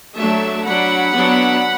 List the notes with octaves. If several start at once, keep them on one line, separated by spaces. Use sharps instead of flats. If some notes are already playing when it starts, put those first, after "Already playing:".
F#3 A3 D4 E5 A5
F#3 D4 F#5 B5
F#3 B3 D4